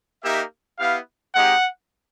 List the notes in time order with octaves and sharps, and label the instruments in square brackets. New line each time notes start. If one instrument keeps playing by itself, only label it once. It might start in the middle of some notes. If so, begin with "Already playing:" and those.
[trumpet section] A#3 D#4 G4 E5
B3 E4 G4 F5
G#3 C4 D#4 G4 F#5